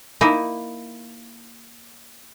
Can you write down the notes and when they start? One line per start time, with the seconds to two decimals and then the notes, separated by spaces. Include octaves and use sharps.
0.21 A#3 D#4 E4